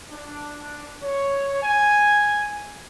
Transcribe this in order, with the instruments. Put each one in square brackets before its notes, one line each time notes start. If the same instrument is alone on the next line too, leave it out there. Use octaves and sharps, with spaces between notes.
[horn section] D4
C#5
G#5